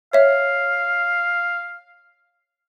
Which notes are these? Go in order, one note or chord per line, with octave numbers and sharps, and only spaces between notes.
C#5 E5 F5